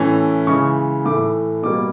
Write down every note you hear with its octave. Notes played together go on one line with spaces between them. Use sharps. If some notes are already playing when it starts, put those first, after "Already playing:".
Already playing: A2 E3 A3 C#4
C#3 E3 G#3 C#6
A2 E3 A3 D6
B2 G3 A#3 D6